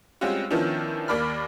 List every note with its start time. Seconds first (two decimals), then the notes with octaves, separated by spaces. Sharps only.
0.21 G3 G#3 C4 C#4 F4 F#4
0.51 D#3 F3 B3 C#4 D4 E4
1.08 D#2 A#3 D5 B5 F6